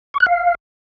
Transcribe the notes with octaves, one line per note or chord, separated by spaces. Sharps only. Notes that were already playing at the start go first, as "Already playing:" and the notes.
C#6
F#6
F5